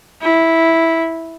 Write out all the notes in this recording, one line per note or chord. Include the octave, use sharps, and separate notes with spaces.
E4